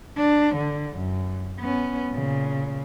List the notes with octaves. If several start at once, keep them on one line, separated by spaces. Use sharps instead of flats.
D4
D3
F#2
B3 C#4
A#2 C#3